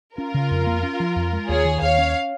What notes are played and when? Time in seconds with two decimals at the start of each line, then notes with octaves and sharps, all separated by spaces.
0.18 C#4 F4 A#4
0.34 C#3
0.51 F2
0.67 A#3
0.83 C#4
1.00 F3
1.16 F2
1.33 G#3
1.49 D#2 G#4 C#5
1.65 D#3
1.81 D#2 C#5 F5
1.98 C#4